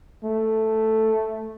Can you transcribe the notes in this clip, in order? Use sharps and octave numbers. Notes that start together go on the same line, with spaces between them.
A3